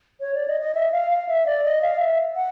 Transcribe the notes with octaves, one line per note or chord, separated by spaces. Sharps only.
C#5
D5
D#5
D#5
E5
F5
F5
E5
D5
D#5
F5
E5
F#5